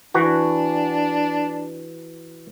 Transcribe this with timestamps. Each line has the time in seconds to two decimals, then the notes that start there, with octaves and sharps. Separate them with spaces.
0.14 E3 D4 F#4